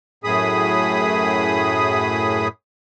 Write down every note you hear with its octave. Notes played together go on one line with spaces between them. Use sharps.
F#2 A2 G#4 B5 D#6